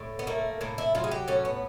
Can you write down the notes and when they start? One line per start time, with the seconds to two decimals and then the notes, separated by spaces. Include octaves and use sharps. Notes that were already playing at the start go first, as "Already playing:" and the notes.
Already playing: A2
0.19 B3
0.27 A3 A#3
0.61 A2 A#3
0.78 E4
0.95 F#3 F4
1.04 G#4
1.11 G4
1.28 A2 C#4
1.45 B3